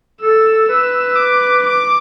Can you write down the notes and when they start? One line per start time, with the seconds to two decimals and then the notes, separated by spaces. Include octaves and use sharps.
0.21 A4 E6
0.69 B4 E6
1.16 D6
1.63 D6